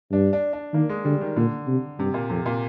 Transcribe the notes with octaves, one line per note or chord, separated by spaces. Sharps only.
G2 D4
D4
D4
D#3 A#3
G#3
D3 G3
D#3
A#2 D3
C3
G2 C3
A#2
F2 C3
A#2